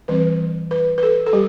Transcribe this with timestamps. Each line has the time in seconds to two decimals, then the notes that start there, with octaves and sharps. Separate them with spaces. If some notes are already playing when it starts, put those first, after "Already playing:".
0.08 E3 G3 C4 B4
0.71 B4
0.98 B4
1.03 A4
1.27 A4
1.33 G3 G4